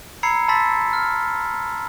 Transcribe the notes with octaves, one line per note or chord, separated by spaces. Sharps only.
A#5 B5 E6 G#6 C7 C#7
A5 B5 C6 E6 A6 B6
F6